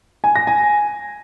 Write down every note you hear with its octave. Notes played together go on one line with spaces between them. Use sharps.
G#5
A#6
G#5